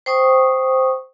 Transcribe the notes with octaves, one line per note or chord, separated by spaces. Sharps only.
C5 G5 C#6 D#6